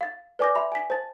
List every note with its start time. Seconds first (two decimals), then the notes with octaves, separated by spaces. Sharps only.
0.01 F5 A6
0.39 B4 D5 G#5 D6 G6 A#6
0.55 E5 B5 C6
0.72 G#5 B6
0.90 C5 A5 A6